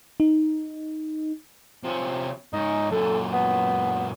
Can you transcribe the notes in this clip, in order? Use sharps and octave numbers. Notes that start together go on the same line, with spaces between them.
D#4
C3 F3 C#4
G#2 C#4 D#4
F#2 A#2 A4
B3